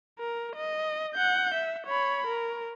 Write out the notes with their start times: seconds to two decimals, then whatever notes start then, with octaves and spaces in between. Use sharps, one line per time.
0.19 A#4
0.56 D#5
1.15 F#5 G6
1.55 E5
1.87 C#5 B5
2.27 A#4